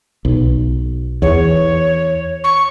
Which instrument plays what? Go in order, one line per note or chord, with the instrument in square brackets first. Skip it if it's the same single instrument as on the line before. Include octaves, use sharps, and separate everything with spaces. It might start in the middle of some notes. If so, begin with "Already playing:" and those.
[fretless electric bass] B1
[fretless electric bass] E2 [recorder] C#5
[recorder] C#6